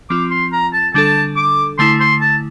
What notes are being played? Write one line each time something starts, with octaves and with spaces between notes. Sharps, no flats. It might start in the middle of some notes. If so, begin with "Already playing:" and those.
F3 C4 F4 D6
C6
A#5
A5
D3 G3 D4 A4 A5
D6
D3 A3 E4 C6
C6
A5